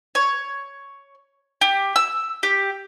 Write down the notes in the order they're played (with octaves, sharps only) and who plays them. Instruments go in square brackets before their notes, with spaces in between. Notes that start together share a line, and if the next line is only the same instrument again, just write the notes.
[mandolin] C#5
G4
E6
G4